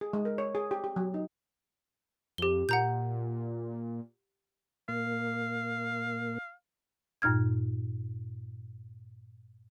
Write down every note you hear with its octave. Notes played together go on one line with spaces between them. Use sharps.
G#4
G#3
A#4
C#5
G#4
G4
G4
F#3
D#4
F2 G4 G7
A#2 F#5 A#5 G6
A#2 A#3 F5
G2 A#2 D#4 F6 G#6